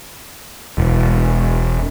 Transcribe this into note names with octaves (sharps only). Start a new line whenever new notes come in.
E1